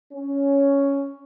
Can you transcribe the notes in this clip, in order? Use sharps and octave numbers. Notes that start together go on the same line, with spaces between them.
C#4